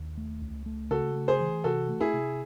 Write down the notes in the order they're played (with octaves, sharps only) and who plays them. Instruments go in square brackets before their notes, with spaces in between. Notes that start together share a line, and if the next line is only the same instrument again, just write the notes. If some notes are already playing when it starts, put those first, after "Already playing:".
Already playing: [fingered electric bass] D#2
A3
C#2
A3
[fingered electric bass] C#3 [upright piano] F#4 A4
[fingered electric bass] A3
[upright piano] G#4 C5
[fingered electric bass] E3
[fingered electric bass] C3 [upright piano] F#4 A4
[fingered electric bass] A3
[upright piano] E4 G#4
[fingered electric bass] C3